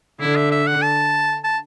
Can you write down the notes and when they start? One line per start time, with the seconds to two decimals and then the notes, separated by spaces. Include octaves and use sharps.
0.21 D3 E4
0.36 E5
0.52 E5
0.67 F#5
0.82 A5
1.44 A5